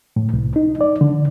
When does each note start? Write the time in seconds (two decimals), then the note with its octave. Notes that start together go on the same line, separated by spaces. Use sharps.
0.16 A2
0.33 C2
0.56 D#4
0.81 D5
1.01 D3